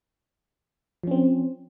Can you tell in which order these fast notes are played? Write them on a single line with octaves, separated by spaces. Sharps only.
F3 C#4 C4